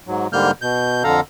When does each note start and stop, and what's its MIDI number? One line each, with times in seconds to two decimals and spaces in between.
0.07 0.27 44
0.07 0.27 54
0.33 0.51 44
0.33 0.51 50
0.33 0.51 55
0.33 0.51 58
0.33 0.51 89
0.33 0.51 91
0.62 1.03 47
0.62 1.03 91
1.04 1.20 41
1.04 1.20 50
1.04 1.20 69
1.04 1.20 77
1.04 1.20 82